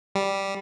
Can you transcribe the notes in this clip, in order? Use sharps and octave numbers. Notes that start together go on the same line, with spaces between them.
G3